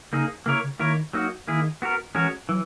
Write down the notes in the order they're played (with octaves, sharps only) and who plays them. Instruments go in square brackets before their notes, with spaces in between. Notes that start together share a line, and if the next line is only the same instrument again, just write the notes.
[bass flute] C#3 [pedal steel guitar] A#3 D#4 G#4
[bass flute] C#3 [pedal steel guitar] A#3 E4 A#4 C#5
[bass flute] C#3
[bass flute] D#3 [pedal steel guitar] A#3 E4 A#4 C#5
[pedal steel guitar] F#3 A#3 D#4 F#4
[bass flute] D#3 [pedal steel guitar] A#3 E4 G#4
[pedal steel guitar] B3 F#4 A#4
[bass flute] E3 [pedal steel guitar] G#3 C#4 F#4 A#4 C#5
[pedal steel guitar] E3 [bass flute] F#3